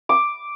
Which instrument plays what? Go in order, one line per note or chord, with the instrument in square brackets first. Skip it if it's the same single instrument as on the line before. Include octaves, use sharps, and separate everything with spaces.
[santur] D6